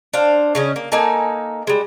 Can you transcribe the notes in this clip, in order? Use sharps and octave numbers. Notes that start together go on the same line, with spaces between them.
D4 C5 F5
C#3 C#4 D#5
A#3
A#3 D#4 A4 G#5
G3 G#3